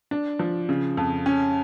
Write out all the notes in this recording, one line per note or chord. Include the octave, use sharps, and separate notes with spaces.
D4
F3
C#3
F2
C#4